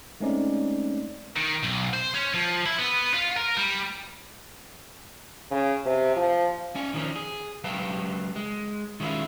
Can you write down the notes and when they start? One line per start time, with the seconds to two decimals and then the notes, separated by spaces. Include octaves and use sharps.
0.20 G#3 A3 C4 C#4 D#4 D5
1.36 D#3
1.63 B1
1.93 C5
2.14 C#4
2.34 F3
2.66 E4
2.79 B3
3.14 F4
3.37 A#4
3.57 G3
5.51 C#3
5.86 C3
6.16 F3
6.75 C#4 D5 G#5
6.94 D#3 F3 C#4
7.16 G#4
7.64 C#2 F#3 B4 F5 G5 A5
8.36 G#3
9.00 D#3 G#3 C#4 E4 F4